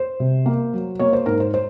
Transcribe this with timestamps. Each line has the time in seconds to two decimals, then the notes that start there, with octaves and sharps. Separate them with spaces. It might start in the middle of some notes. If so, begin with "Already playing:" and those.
Already playing: C5
0.20 C3
0.46 A#3
0.73 F#3
0.99 A#3 C#5
1.13 C5
1.26 G#2 A#4
1.40 C5
1.54 C5